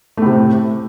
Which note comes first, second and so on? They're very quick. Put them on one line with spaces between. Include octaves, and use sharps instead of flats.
A3 A2 C3